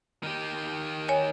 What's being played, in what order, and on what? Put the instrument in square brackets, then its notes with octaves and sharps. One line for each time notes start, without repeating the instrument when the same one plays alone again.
[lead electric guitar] D#3 G4
[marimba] C#5 G#5